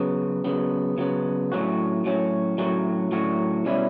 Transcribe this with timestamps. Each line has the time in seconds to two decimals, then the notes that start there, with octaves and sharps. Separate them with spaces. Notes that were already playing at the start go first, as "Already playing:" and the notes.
Already playing: C#3 F#3 B3
0.44 C#3 F#3 B3
0.98 C#3 F#3 B3
1.52 A2 F#3 C#4 F#4
2.04 A2 F#3 C#4 F#4
2.58 A2 F#3 C#4 F#4
3.12 A2 F#3 C#4 F#4
3.65 B2 G3 C#4 E4